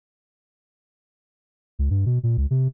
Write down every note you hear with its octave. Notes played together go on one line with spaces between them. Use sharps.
C#2
G2
B2
A#2
C#2
C3